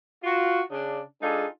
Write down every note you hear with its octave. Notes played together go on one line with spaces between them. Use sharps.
F4 F#4
C#3 D4
G#3 D4 D#4 F4 G#4 A4